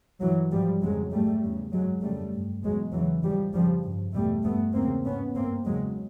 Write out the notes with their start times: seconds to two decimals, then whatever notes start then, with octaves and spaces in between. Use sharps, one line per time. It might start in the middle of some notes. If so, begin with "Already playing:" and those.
0.21 G2 E3 F#3
0.51 G#2 F3 G3
0.81 F2 C#3 F#3 G#3
1.11 G#2 G3 A3
1.42 E2 C#3
1.72 G2 F#3 G#3
2.02 F2 C#3 G3 A3
2.33 G2
2.62 E2 B2 F#3 G#3
2.92 E2 C#3 E3 F#3
3.22 G#2 F3 G3
3.53 F2 C#3 F3 G3
3.83 G2
4.13 E2 B2 G3 A3
4.44 G2 A3 B3
4.73 E2 C#3 A#3 C4
5.04 G#2 B3 C#4
5.34 G2 A#3 C4
5.64 E2 C#3 F#3 G#3